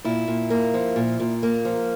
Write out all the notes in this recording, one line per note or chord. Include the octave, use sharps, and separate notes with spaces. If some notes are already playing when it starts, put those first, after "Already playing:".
A#2 E4
A#2
A#3
F3
A#2
A#2
A#3
F3